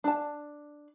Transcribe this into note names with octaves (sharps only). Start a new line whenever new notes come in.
D4 A5